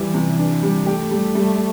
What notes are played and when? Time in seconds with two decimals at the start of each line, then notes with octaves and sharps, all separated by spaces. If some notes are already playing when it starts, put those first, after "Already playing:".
Already playing: E3 G3
0.14 C3
0.39 D4
0.63 G3
0.86 A3 G4
1.11 G3
1.35 G3